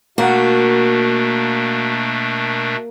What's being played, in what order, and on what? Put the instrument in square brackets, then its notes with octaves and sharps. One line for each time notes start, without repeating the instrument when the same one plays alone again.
[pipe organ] B2 A3 D4 [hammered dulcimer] A#3 [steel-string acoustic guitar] F#4